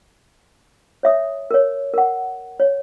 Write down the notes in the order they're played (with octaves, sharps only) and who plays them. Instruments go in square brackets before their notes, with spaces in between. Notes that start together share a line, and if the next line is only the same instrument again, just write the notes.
[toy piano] C#5 E5 D#6
A#4 C#5
A#4 F#5
C#5